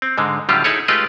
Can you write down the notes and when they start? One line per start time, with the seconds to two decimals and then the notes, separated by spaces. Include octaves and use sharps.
0.02 C4
0.18 G#2 D3 G#3
0.49 A2 D3 F#3 G3 F4 G4
0.64 D#4 E4 G#4 A4 C#5
0.88 G#3 A3 F4 G4 B4 D#5